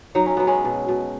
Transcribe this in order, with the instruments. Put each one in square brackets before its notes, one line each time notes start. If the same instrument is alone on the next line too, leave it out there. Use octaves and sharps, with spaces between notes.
[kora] F#3 D#4
C#4
F#3 B3
G#3 C#4
B2
B2